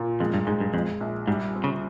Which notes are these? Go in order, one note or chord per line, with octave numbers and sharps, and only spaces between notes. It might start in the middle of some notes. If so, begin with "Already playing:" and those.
Already playing: A#2
F2 G#3
G2
G#2 G#3
G2
F2 G#3
A#1
G#2 G3
C4
C#3